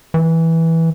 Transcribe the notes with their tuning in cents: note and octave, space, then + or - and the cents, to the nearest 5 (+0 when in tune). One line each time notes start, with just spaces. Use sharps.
E3 -10